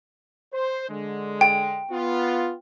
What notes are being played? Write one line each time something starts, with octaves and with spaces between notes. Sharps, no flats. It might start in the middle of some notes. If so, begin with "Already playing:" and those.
C5
D3 G#3
G5
B3 F4